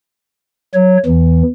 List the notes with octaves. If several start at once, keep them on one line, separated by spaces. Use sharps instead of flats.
F#3 C#5
E2 E3